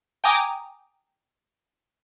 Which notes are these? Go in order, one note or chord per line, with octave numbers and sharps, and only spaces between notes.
G5 G#5 A#5 D6 D#6